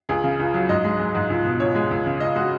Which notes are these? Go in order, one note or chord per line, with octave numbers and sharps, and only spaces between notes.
C#2 G#4
C#3
C#2
F#3
G#2 D#5
G#3
G#3
G#2
C#2
B2
C#2 C#5
G#3
C#2
C#3
C#2 D#5
G#3 F#4